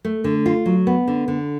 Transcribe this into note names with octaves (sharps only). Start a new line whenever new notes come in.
A3
D3
F4
F#3
B3
D3
D3